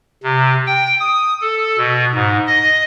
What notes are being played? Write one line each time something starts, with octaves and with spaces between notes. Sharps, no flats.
C3
G5
D#6
A4
B2
G#2
D#5